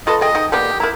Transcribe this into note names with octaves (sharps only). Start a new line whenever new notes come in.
F4 A4 B4 D#5
G#4 D#5 G5
D#4 G5
A#3 B3 G4 D5
E4 A#4 A#5